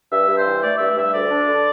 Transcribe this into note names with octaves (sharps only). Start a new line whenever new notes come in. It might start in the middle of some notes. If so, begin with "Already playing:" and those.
G2 E5
G2
C5
E3
A3 D5
G2 E5
G2 E5
D2 D5
D4
D3